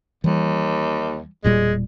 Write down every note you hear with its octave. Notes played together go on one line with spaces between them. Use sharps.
D#2 E3 G3
E1 A#2 G3 G#3